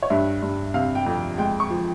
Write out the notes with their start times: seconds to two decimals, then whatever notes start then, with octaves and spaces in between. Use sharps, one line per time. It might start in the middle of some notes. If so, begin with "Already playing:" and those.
0.03 C#5
0.10 G2 E5
0.42 G2
0.74 C3 F5
0.95 G5
1.06 F2
1.38 G#3 G5
1.60 C#6
1.70 F3